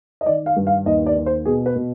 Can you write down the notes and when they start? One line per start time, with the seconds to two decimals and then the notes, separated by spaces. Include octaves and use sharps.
0.21 D#5
0.26 D#3 D5
0.46 F5
0.56 G2
0.67 F5
0.86 D#2 D#5
1.06 D5
1.17 D#2
1.26 C5
1.45 B2 G#4
1.66 B4
1.76 B2